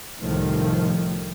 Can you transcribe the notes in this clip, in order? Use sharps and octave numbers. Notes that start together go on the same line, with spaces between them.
C2 A2 D#3 F3